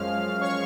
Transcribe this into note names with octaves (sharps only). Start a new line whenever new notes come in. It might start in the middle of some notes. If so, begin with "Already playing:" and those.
Already playing: F#2 F3 G#3 C#4 F5 F6
C#5 C#6